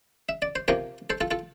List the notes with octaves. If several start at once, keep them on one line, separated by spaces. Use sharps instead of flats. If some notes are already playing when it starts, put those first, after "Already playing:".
E5
D5
C5
C3 F3 A#3 G4 A#4
A4 C5
F4 A4
F4 A4